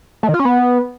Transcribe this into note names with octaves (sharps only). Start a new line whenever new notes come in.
A3
D#3
F4
C#4
B3